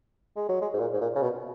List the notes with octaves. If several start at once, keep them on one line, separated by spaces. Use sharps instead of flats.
G#3
F#3
G#3
G#2
A#2
G#2
A#2
C#3
B2